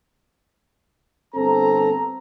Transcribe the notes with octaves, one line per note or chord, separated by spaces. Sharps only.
G1 C4 A4 A#5